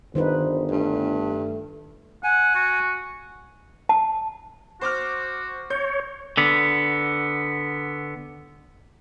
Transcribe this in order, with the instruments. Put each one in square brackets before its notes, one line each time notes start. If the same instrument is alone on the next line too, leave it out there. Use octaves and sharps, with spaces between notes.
[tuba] G1 [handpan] D#3 D#4 B4 [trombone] C5
[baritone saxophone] G2 [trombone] A3
[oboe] F#5 [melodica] G#5
[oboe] F#4
[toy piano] A5
[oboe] F#4 [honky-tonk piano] C5 D6 F6
[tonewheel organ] C#5 [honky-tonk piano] G6
[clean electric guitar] D3 B3